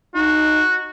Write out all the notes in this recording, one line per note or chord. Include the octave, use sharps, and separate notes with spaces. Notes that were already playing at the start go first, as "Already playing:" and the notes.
D#4 F#4